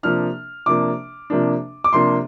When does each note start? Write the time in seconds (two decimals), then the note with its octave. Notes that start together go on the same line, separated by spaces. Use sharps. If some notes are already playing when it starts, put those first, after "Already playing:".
0.03 C3 F3 A#3 D4 F6
0.66 C3 F3 A#3 D4 D6
1.30 C3 F3 A#3 D4
1.84 D6
1.93 C3 F3 A#3 D4 C6